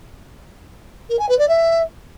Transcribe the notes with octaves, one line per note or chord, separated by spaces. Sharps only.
A#4
G#5
B4
D5
E5